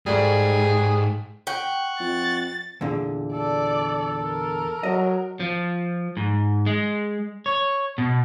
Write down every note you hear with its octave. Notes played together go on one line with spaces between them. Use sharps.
G#2 G3 A3 G#4
F#5 G5 C#6
F2 A6
E2 A#2 D3
A4 D5
A#4
F#3 D#5
F3
G#2
G#3
C#5
B2